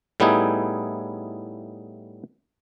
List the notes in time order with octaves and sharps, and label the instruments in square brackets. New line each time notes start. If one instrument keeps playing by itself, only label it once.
[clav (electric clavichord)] A2 G3 B3 D#4 E4 G#4